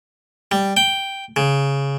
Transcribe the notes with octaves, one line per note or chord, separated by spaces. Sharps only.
G3
G5
C#3